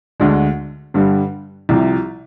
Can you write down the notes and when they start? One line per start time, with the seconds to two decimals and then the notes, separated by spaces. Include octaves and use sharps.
0.20 D2 D3 G#3 D4
0.94 G2 D3 G3
1.69 C2 C3 F3